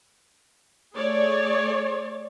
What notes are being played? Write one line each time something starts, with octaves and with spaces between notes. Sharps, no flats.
A3 G#4 C#5 D5